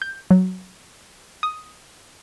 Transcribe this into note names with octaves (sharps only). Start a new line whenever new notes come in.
G6
F#3
D#6